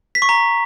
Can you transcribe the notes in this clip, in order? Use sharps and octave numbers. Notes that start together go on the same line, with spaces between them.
B6
C#6
A#5